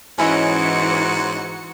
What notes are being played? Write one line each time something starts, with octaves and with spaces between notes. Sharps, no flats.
G#2 E3 C#4 E4 F#4 D#5 C#7